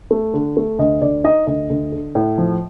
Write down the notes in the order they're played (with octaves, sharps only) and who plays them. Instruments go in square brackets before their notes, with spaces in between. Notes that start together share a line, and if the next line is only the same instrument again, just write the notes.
[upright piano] A3
D3
A3
D2 D#5
D2 D5
D#4 D#5
D2 D#5
D2
D3
A2
F3